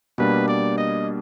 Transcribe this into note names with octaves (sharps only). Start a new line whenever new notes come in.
B2 G3 A#3 D4 B4
D5
D#5